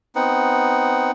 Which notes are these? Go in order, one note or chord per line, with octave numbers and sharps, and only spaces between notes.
B3 C4 D#4 F#5